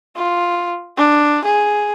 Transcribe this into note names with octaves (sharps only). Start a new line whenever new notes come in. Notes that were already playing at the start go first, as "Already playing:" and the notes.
F4
D4
G#4